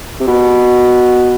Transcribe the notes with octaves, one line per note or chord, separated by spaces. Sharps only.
C3
B2